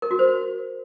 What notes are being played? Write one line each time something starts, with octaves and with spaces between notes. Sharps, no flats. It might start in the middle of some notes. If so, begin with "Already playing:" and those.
A#4
F#4
C5